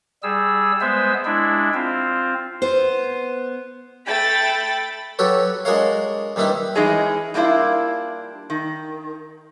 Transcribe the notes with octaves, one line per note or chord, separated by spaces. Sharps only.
G3 G#4 E6
G#3 B3 C5 E5 E6
G#3 D4 E4
C4 F4
B3 C5
A3 G5 B5 A6
F#3 G4 A4 B4 C#5
G#3 D4 F#4 A#4 C#5 F5
G2 D#3 G3 E4 B4 B5
E3 G#3 C#4 D#4 G#4 C#5
G3 A#3 D4 E4 F4
D#3